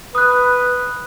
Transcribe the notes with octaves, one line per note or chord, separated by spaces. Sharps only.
B4 D#6 F#6